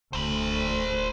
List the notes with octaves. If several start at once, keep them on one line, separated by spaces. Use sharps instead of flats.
D#1 D2 C5 B5